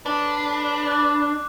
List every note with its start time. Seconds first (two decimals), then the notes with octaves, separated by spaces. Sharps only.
0.06 D4 B4
0.88 D6 F#6